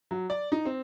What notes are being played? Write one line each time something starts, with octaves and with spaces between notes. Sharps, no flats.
F#3
D5
D#4
C4